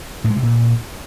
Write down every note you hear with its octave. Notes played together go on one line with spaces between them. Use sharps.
A2
G#3
C3
A#2